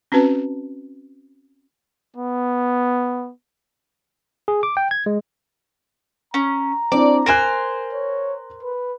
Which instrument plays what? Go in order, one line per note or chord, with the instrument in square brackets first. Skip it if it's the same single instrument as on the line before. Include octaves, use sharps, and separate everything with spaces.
[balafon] C4 C#4 F#4 B4 A5
[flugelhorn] B3
[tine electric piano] G#4
D6
G5
G#6
G#3
[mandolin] C#4 [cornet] A#5
[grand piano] C4 D4 E4 [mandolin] D5
[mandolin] A#4 C5 G#5 [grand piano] F#6 D7
[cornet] C#5
B4